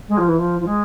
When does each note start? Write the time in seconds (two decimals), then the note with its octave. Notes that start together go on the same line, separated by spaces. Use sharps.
0.08 G#3
0.17 F3
0.27 E3
0.38 F3
0.59 F3
0.66 G#3